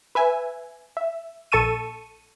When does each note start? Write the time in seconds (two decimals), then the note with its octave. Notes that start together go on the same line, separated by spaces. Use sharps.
0.15 B4 E5 G#5
0.97 E5
1.52 A#1 A4 A5 C#6 E6 D#7